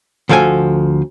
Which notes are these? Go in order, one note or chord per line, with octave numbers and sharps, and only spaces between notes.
D2 F3 A4 G5 G#5